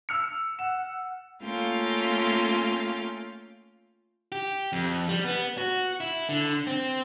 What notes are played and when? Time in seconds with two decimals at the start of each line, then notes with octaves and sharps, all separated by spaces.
0.09 E6 F6 C#7
0.59 F#5 E7
1.44 A3 A#3 C#4 F4 F5 G5
4.32 G4
4.72 F2
5.09 G3
5.25 B3
5.58 F#4
6.00 E4
6.29 D3
6.67 C4